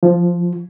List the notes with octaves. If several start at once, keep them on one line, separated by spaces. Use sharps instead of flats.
F3